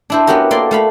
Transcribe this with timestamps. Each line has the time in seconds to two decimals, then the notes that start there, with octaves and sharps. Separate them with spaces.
0.10 D4 E4 C5
0.27 B3 C#4 F#4 G4 A#4
0.51 A#3 A4 D5 C6
0.71 A3 F5 B5